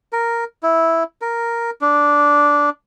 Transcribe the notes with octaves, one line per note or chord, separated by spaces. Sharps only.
A#4
E4
A#4
D4